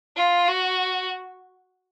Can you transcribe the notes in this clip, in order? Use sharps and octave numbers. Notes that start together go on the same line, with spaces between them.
F4
F#4